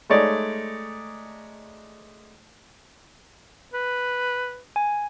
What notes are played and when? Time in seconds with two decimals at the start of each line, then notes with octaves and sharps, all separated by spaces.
0.10 G#3 A3 D#4 C#5 D5
3.74 B4
4.76 G#5